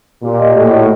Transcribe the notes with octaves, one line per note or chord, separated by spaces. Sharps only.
A#2 G4
D#5
A2 F#4
F#4